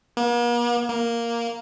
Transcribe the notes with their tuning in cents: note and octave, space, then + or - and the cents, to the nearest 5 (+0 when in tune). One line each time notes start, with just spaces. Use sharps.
A#3 +45
A#3 +0